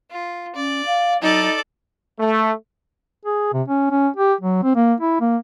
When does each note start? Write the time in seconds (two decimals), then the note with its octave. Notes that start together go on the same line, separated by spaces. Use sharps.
0.11 F4
0.55 C#4 D5
0.86 F5
1.22 F#3 D#4 A4 D5
2.20 A3
3.25 G#4
3.53 C3
3.68 C#4
3.91 C#4
4.16 G4
4.41 F#3
4.63 C4
4.75 A#3
5.01 E4
5.20 A#3